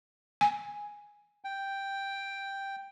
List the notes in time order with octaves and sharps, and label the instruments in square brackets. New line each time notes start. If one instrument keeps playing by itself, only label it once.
[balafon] G#5
[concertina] G5